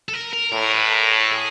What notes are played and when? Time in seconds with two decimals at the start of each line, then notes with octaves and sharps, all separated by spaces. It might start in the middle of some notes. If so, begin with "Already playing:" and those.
0.08 A4
0.13 A#4
0.33 A#4
0.52 A2 A#4
0.72 B4
0.92 A#4
1.12 A4
1.32 G#4